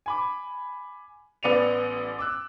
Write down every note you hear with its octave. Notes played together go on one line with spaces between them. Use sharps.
G#5 B5 D6
A1 B3 D5 C#7 D#7 F7
D6 E6 F#6